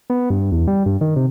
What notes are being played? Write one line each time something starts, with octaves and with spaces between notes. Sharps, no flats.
B3
G2
E2
G3
G2
D#3
C3